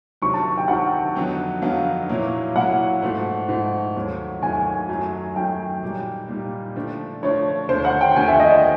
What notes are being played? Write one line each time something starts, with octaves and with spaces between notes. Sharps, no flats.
D2 C3 D#3 F#3 C#6
A5
G5
D2 C3 D#3 F#3 F#5
F2 D3 F#3 B3 D#4
F2 D3 F#3 B3 D#4 F5
A#2 F#3 A#3 C#4 E4
A#2 F#3 A#3 C#4 E4 F#5
G#2 F3 A3
G#2 F3 A3
D#2 D#3 F#3 A3 C#4
D#2 D#3 F#3 A3 C#4 G#5
F#2 D#3 F#3 A3
F#2 D#3 F#3 A3 G5
A#2 G3 A#3 D#4
A#2 G3 A#3 D#4
D3 F3 A3 D4
D3 F3 A3 D4 C#5
D#2 D3 F3 A3 C5
F#5
G5
D#2 D3 F3 A3 G#5
E5
D#5
D5